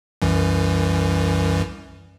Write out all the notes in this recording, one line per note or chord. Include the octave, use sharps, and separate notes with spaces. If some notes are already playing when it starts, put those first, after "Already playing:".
C2 F#2 E3